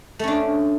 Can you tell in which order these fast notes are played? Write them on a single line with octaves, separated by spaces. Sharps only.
A3 C#4 D4